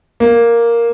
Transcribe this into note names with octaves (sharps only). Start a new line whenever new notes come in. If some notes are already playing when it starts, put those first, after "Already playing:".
A#3